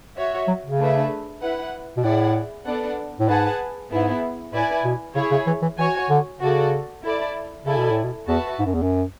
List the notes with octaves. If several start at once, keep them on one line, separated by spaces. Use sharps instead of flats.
F#4 C#5 E5
F#3
C#3
A3 D4 G#4 B4 E5
E4 B4 F#5
B2
A2 E4 G#4 D5 F#5
B3 D4 A4 D5 F#5
A2
G#2 G#4 B4 F#5 A5
G#2 B3 E4 G#4
A2 E4 B4 D5 G#5
B2
C#3 E4 G#4 C#5
C#3
E3
E3
E3 F#4 C#5 G#5
D3
C#3 F#4 A4 D5
E4 A4 D5
C#3 E4 A4 D5 G#5
B2
A2
B2
E2 F#4 B4 E5 A5
G#2
F#2
E2
F#2